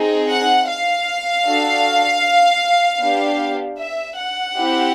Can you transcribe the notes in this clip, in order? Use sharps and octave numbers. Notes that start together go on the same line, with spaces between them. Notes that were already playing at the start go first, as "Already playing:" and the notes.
Already playing: C4 D#4 G#4
F#5
F5
D4 F#4 A4
B3 D4 G4
E5
F#5
C4 E4 G4